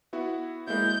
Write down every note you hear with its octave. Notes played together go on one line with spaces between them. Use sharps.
B3 E4 F#4
G#3 A#3 E4 G6